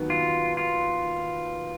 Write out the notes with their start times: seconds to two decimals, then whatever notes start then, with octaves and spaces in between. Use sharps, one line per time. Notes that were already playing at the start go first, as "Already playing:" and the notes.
Already playing: D#2 D#3 F#3 B3
0.10 F4
0.57 F4